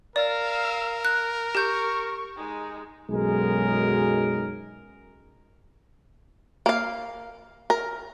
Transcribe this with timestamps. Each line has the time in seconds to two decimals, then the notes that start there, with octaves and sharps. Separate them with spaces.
0.16 A#4 D5 F5 E6
1.05 F#6
1.55 G4 C#6 G6
2.37 G#3 D#4
3.10 B1 F#2 G#3 D#4 G#4 A#4
6.66 A#3 F5
7.70 A#4